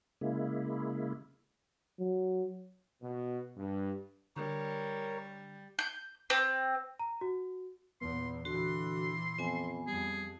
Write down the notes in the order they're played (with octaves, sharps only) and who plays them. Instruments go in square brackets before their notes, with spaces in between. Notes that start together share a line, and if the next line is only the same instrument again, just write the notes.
[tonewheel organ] C#3 G#3 A#3 E4
[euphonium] F#3
[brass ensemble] B2
G2
[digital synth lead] D3 [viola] G3 [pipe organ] A#4 C#5
[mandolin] G6
C4
[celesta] A#5
F#4
[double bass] E2 A#2 [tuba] B3 [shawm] C6
[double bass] A#2 E3 [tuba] D3 [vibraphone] F#4 [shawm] C6
[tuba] F2 [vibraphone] B3 G#5
[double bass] F2 [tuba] G3 [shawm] G#4